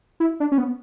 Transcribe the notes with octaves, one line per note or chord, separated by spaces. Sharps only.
E4
D4
C#4
B3